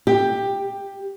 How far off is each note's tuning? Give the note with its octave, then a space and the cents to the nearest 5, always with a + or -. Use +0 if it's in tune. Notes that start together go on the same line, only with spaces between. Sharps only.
G4 +10